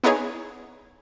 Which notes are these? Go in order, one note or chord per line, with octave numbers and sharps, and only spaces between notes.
B3 D#4 E4 G#4 C#5